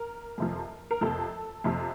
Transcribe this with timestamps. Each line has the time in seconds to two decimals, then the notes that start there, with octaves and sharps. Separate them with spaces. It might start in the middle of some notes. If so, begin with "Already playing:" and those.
Already playing: A#4
0.38 F2 C3 F3
0.91 A#4
1.01 F2 C3 F3 A4
1.64 F2 C3 F3